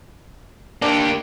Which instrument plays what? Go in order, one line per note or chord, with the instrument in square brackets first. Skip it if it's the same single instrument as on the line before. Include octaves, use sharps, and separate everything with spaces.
[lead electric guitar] A#3 G4 [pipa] D4